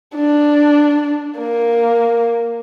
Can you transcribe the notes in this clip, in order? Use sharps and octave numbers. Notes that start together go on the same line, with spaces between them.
D4
A#3